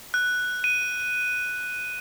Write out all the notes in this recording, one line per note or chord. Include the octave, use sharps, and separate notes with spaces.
F#6
D#7